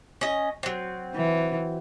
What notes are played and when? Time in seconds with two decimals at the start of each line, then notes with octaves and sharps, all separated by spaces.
0.21 C#4 D#5
0.63 F#3 C4
1.15 E3